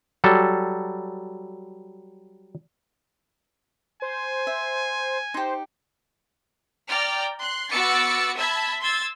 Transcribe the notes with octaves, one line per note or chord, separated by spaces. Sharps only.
F#3 G3 A4
C5 G#5
E5
D#4 G4 C5
D5 G5 A#5 F6
C6 F#6
B3 F#4 D6 E6 A6 C#7
E5 A5 B5 E6 G#6
C6 E6 G#6 A6